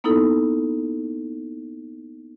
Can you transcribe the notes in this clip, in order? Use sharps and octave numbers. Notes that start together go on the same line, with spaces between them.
A#3 B3 D#4 E4 A4